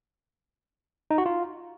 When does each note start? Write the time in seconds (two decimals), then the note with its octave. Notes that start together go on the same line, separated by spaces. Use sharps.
1.11 D#4
1.18 F#4
1.26 F4